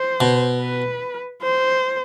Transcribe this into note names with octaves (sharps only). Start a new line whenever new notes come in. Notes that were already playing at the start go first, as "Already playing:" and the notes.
Already playing: C5
B2
B4
C5